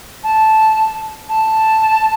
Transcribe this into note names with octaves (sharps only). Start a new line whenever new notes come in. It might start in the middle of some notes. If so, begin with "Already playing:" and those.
A5
A5